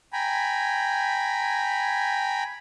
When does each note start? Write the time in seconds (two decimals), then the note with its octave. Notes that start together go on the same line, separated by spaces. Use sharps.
0.13 G5 G#5 A#5 B5